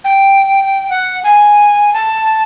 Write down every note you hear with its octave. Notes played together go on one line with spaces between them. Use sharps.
G5
F#5
G#5
A5